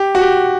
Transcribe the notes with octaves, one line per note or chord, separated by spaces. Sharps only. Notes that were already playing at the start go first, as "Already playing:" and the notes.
Already playing: G4
F#4
G4